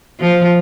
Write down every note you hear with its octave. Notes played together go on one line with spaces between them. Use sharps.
F3